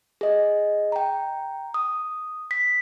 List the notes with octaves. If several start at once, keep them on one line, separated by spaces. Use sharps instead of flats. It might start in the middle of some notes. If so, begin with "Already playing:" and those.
G#4 D#5
G5 A#5
D#6
B6